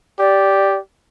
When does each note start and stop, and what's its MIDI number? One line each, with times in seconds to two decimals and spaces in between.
0.19 0.79 67
0.19 0.75 74